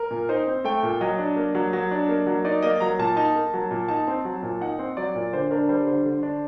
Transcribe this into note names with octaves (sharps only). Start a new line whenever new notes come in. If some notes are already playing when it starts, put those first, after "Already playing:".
Already playing: A#4
A#2
D#4 C5
C4
A3 G5
A#2
F#3 D#5
D4
A#3
F#3
F#3
D4
A#3
F#3
D#4 D5
A#3 D#5
F#3 A#5
A#2 A5
D#4 A5
A#3
F#3
A#2
D#4 A5
C4
F#3
A#2
D#4 F#5
C4
F#3 D5
A#2
D3 C5
D4 A#4
G3 C5
D3 C5
D3
D4